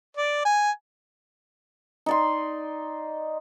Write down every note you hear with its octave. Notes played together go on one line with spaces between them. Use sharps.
D5
G#5
D#4 D5 C6